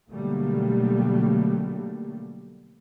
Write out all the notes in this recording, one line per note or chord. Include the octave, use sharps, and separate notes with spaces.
B2 D3 F#3 G3 A3 A#3